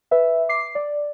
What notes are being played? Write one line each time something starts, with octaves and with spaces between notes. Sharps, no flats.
B4 E5
D6 C7
D5